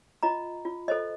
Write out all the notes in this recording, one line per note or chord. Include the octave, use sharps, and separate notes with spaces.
F4 D#5 A#5
F4
A4 C5 D#5